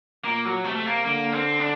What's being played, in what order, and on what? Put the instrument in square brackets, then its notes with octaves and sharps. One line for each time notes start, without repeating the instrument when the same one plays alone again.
[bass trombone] A#2 [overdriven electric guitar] A#3
[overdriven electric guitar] F#3
[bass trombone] C3 [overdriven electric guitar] A3
[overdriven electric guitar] A3
A#3
[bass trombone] D3 [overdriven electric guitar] A#3
[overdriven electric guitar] C4
D4